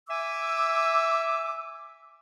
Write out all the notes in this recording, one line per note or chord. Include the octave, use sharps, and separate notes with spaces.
E5 G#5 D6 E6